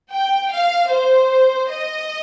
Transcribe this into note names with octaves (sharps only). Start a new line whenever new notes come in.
G5
F5
C5
D#5